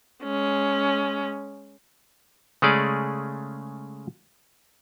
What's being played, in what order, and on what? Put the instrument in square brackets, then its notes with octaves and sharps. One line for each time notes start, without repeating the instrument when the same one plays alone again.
[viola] G#3 C#4
[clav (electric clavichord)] C#3 G#3 A3 C#4 G#4 D5